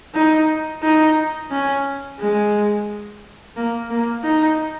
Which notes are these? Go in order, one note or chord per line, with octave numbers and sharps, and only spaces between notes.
D#4
D#4
C#4
G#3
A#3
A#3
D#4